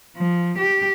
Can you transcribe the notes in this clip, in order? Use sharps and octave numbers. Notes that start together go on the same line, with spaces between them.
F3
G4